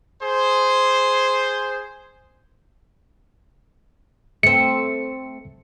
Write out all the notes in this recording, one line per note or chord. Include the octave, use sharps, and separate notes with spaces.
G#4 C5
A3 C4 C#7